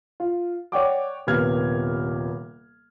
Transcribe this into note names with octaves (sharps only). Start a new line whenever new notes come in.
F4
C#5 D5 F#5 G5 C#6 D6
D#1 C3 A#3 B3 F6 G#6